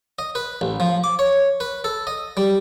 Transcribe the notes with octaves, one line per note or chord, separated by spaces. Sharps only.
D#5
B4
A1
F3
D6
C#5
B4
A4
D#5
G3